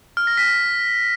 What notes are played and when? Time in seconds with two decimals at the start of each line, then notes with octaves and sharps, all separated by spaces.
0.17 F6
0.27 A#6
0.37 B6